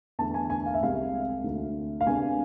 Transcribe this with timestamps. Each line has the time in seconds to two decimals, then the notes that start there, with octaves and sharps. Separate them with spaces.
0.19 E2 D3 A3 A5
0.34 G#5
0.50 G#5
0.66 F5
0.74 E5
0.81 C2 C3 G#3 F5
1.44 D2 D3 A3
2.01 F5
2.06 C3 G#3 B3 D4 G#5